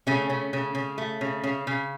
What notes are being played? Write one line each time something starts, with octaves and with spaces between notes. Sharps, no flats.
C#3 A3 C#4
C#3
C#3
C#3
A3
C#3
C#3
C#3